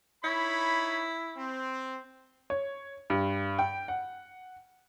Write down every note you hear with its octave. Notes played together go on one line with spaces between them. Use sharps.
D#4 E4 C#5 B5
C4
C#5
G2
G5
F#5